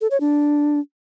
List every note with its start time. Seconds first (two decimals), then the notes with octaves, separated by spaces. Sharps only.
0.01 A4
0.11 C#5
0.20 D4